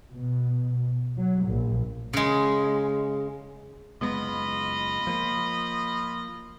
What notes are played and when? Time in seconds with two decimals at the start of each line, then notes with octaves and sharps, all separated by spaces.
0.12 B2
1.17 F#3
1.45 A#1
2.13 C#3 G#3
4.01 F#1 G#3 B3 F4 D#5 B5
5.07 F3 A#3